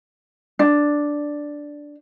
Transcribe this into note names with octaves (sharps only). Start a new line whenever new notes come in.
D4